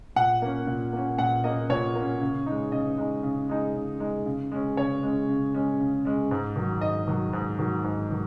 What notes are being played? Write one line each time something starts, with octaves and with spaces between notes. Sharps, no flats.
A#2 F#5
A#3 C#4
A#2
A#3 C#4
A#2 F#5
A#3 C#4 D#5
A#2 C#5
A#3 C#4
C#3
G#3 D#4
C#3 D#5
G#3 D#4
C#3
G#3 D#4
C#3
G#3 D#4
C#3
G#3 C#4
C#3 C#5
G#3 C#4
C#3
G#3 C#4
C#3
G#3 C#4
G#2
D#3 F#3
G#2 D#5
D#3 F#3
G#2
D#3 F#3
G#2
D#3 F#3